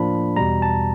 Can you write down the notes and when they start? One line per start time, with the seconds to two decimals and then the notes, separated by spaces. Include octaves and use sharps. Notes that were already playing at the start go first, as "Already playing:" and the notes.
Already playing: A2 F3 A#3 D4 B5
0.36 E2 B2 G3 A#5
0.62 A5